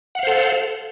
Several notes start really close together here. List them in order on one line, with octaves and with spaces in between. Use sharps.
F#5 F5 C5 A4